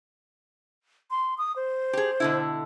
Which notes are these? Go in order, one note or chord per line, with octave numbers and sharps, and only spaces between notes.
C6
D#6
C5
G4 G#4
B2 D3 E4